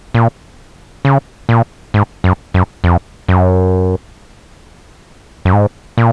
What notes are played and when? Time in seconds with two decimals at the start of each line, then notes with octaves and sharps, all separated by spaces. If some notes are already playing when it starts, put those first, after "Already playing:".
0.15 A#2
1.05 C#3
1.49 A#2
1.94 G#2
2.24 F#2
2.54 F#2
2.84 F2
3.28 F#2
5.45 F#2
5.53 G#2
5.98 A#2